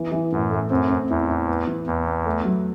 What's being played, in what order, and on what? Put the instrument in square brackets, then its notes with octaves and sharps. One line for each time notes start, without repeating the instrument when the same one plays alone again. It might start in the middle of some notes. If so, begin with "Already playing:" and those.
Already playing: [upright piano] E3 B3
E3
[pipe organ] F#2 [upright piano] A2
[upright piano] A3
[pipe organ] F#2 [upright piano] C4
[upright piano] C4
[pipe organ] E2 [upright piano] E4
[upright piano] E4
B3
E3
[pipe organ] E2 [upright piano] B3
[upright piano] B3
A3
F#3